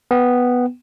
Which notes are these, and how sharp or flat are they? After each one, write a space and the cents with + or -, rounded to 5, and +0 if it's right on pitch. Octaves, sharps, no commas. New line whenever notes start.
B3 +0 G5 +0